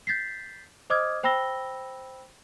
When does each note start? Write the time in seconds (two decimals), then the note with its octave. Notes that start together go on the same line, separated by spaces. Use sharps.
0.07 G6 A6 B6 C7
0.90 C5 D#5 D6 D#6 F6 G#6
1.23 C5 G5 B5 E6 A#6 G7